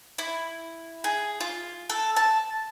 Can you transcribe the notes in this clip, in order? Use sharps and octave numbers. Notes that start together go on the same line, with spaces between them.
E4
G#4
F4
A4
A5